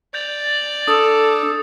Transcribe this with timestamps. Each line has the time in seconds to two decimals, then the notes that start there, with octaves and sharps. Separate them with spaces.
0.14 D5 G6 A6 F7
0.88 D4 A4 D#6